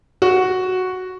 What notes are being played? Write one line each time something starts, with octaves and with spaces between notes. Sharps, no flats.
F#4